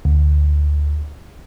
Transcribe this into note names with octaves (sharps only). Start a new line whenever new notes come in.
D2